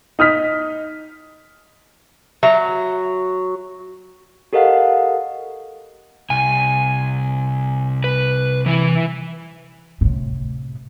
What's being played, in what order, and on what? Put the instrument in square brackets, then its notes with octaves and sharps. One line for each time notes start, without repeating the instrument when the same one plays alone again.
[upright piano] D#4 D#6 F6 B6
[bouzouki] F#3 [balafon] E5
[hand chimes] G4 A4 A#4 D#5 F5 F#5
[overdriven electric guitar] C2 [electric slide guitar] G#5
[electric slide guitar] B4
E3 B4
[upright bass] A2 C3